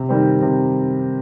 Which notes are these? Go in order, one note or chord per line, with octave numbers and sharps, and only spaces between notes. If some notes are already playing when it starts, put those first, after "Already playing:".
Already playing: C3
D#3 G3 C4
C3